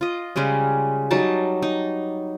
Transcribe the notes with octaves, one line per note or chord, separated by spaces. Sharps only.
F4 D#5
C#3 G3 G#3 C#4
F#3 G3 D#4 A5
D#4